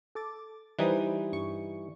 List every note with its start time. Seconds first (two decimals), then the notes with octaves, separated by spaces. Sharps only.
0.15 A4 D6 A6
0.79 E3 G3 D#4 B4 C5 D#6
1.33 G2 C#6